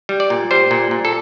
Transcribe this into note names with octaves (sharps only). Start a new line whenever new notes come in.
G3
D5
A#2
G3 C5
A#2
A#2
A4